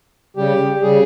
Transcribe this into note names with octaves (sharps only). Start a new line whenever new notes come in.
C#3 G3 G4
C#3 G3 G#4